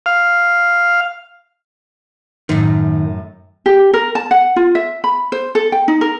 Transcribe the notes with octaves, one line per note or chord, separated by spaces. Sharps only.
F5
F#2 A2 D#3
G4
A#4
A5
F#5
F4
E5
B5
C5
A4
G5
D#4
A#4